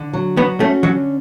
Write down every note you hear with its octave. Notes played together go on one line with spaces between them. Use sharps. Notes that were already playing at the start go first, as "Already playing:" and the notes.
Already playing: D3
F#3
B3 F#4
A3 C#4
D3 F#3